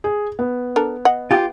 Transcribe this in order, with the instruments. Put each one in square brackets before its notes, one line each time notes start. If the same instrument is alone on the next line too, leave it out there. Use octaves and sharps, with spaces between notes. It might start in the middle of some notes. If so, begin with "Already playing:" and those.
[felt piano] G#4
B3
[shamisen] D4 A4 A#4
D#5 F#5
[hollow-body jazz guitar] F4 G4